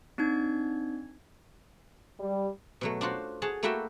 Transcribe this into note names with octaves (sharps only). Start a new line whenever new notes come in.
C4 D4 D#4 G#6
G3
B2 F#3 A3
D4 F4 F#4 C5
G#4 C#5 F#5 A5
A3 A#3 E4 F#4 E5 G5